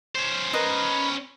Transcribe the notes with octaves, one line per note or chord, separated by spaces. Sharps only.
C#4 C5
A#4 B4 D#5